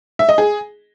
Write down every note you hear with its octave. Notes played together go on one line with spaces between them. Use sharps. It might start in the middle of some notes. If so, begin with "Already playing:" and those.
E5
D#5
G#4